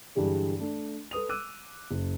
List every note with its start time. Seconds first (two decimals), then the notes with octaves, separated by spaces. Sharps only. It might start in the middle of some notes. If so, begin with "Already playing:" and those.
0.15 G2 D3 E3 G3 G#3
0.60 A3 D4
1.11 A4 B4 D#6 F7
1.29 D6 E6 F#6 D#7
1.91 F#1